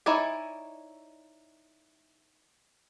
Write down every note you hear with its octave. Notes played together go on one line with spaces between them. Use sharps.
D#4 E4 C#5 D5 G#5